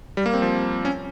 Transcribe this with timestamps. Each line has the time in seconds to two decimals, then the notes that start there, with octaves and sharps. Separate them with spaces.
0.17 G3
0.26 A#3
0.34 C4
0.42 F3
0.85 C#4